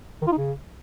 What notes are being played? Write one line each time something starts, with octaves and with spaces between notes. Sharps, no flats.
D#3
F4
D#4
C#3